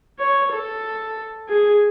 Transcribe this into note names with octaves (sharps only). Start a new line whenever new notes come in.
C#5
A4
G#4